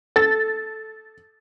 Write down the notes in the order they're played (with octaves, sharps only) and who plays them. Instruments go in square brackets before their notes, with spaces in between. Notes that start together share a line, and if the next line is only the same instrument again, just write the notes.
[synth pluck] A4 [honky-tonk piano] A6